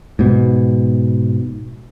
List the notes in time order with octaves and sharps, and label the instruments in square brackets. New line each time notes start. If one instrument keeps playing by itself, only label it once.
[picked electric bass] G#2 B2